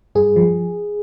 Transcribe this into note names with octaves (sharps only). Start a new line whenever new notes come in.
G2 G#4
F3